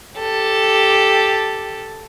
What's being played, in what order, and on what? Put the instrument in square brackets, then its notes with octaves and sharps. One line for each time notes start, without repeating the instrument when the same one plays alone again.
[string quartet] G4 A4